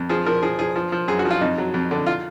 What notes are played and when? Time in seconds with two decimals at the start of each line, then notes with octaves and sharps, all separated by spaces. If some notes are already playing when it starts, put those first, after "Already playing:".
Already playing: F2
0.09 F3 G#4
0.26 F3 A#4
0.43 F3 G#4
0.59 F3 G#4
0.76 F3
0.92 F3
1.08 F#2 G#4
1.19 F#4
1.25 F3
1.31 F4
1.41 F2 D#4
1.58 F#3
1.74 F2
1.91 D3
2.06 F4